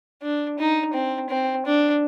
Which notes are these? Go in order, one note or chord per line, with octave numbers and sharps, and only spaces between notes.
D4
D#4
C4
C4
D4